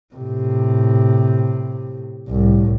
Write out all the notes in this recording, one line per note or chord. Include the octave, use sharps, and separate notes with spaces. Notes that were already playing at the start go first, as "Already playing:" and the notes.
A2 C3
C2 A2